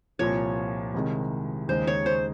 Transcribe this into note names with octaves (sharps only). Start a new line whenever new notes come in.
C2 A#2 F3 C#5
C2 C3 D#3 G#3
D#2 C#3 G#3 D#4 C5
C#5
C5